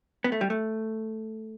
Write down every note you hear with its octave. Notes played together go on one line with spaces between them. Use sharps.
B3
A3
G3
A3